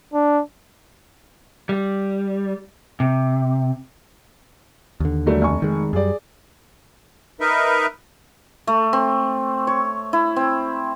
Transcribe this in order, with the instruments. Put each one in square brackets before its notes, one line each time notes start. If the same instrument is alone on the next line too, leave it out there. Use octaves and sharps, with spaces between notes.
[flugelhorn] D4
[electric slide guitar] G3
C3
[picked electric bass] D#2 D3
[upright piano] F#3 G3 A3
F1 G#5 C#6
[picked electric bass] D#3 G#3
[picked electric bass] F#2 G3 [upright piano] G#4 D5
[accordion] D#4 A#4 B4 E5
[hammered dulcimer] A3
C4
C#5
E4
C4